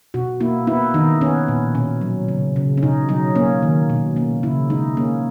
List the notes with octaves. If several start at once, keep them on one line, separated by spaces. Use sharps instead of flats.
B2 F#4
A#3 E4
B3 E4
D#3 D#4
B3 C#4
A#2
B2 C#4
F#3
C#3
C#3
C#4
B2 D#4
F#3 D#4
A#3 C#4
D#3
B2
A#3 C#4
C#3 E4
G#3 D#4
A#3 C#4